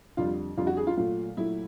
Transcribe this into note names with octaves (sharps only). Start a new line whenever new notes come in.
F2 D3 G3 F4
F2 D3 G3 F4
F#4
G#4
F4
A#2 F#3 A3 F4
A#2 F#3 A3 E4